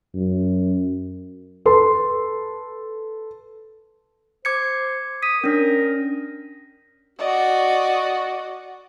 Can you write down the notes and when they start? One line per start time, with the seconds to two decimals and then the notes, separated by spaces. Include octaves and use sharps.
0.14 F#2
1.65 A4 B4 C6
4.45 C5 D6 G#6 C#7
5.23 D#6 B6
5.44 C#4 D4 A#4
7.19 F#4 D5 D#5